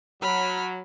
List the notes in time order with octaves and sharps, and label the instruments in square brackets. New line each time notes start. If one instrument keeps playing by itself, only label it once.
[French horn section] F#3 [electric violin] B5 F6